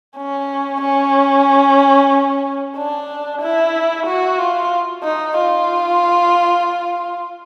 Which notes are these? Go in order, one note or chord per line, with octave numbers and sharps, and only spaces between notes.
C#4
C#4
D4
E4
F#4
F4
D#4
F4